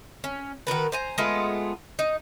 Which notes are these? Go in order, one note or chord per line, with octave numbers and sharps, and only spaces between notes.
C#4
D#3 F#4 A#4 B4
C5 G#5 A#5
G#3 A3 B3 F4
D#4